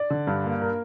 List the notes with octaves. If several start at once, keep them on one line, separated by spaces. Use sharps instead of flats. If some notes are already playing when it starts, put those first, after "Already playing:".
Already playing: D5
D3
G2
A#3
A#4